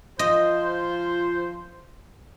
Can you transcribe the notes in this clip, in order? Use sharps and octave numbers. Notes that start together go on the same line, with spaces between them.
F3 F4 C5 D#5